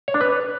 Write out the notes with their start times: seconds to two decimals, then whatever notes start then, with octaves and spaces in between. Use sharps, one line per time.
0.08 C#5
0.14 D4
0.21 B4